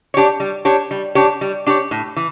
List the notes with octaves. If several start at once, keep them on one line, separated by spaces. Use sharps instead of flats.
D4 G4 C#5
G3
D4 G4 C#5
G3
D4 G4 C#5
G3
D4 G4 C#5
A2
E3